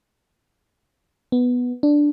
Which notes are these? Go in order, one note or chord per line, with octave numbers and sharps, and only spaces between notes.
B3
D4